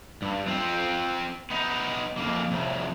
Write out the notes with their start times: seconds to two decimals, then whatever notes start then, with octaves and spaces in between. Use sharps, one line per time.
0.22 G2
0.48 C4 F4
1.51 B3 D#4
2.17 F2 A#3
2.51 C2 F2